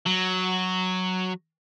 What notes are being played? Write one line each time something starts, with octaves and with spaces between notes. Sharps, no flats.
F#3